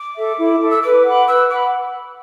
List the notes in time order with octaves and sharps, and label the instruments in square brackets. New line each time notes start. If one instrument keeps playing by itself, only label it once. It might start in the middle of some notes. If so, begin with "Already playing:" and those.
Already playing: [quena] D6
[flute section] A4 E5
E4
A4 E5
[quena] E6
[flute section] B4 [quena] D6
[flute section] F#5 B5
[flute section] B4 [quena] E6
[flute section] F#5 B5 [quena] D6